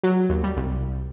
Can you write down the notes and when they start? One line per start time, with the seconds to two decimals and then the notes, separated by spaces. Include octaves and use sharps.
0.03 F#3
0.29 D#2
0.44 G3
0.57 C2